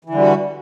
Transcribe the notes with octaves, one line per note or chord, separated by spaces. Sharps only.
D3 E3 G3 F#4